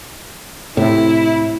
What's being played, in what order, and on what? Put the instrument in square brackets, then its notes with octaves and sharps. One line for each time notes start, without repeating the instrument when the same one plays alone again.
[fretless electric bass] A2 C3 [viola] E4